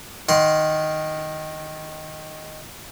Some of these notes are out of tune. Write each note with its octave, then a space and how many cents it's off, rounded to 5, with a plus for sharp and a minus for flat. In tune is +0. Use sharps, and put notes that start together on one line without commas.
D#3 +0 F#5 -25 C6 +0